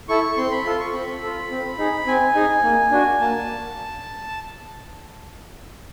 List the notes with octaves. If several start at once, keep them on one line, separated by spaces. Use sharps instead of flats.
E4 A4 C#6
C4 C6
B5
F4 A4 C6
C#6
C4 B5
F4 A4
C4
D#4 G#4
C4 G#5
D#4 G#4
A#3
D4 F#4
A#3 A5